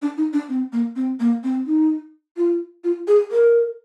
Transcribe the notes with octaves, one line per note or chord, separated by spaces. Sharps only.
D4
D#4
D4
C4
A#3
C4
A#3
C4
D#4
F4
F4
G#4
A#4